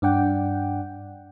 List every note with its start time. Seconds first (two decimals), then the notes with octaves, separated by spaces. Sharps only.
0.02 G2 D4 D5 F#5 G5